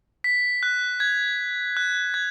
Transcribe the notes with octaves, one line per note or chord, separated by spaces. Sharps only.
B6
F#6
G#6
F#6
G#6